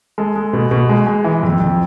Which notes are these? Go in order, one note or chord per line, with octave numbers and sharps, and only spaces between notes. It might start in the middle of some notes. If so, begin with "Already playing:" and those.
G#3 A4
G#3
B2
B2
G#3
G#3
E3
F2
F2